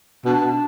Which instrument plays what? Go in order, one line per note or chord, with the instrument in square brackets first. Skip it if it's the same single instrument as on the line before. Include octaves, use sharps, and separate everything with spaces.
[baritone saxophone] B2 [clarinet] D4
[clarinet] D4